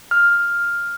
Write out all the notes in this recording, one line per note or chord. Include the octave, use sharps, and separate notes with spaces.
F6